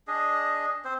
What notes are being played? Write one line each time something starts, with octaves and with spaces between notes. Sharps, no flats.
D4 G#4 D#5
C4 C5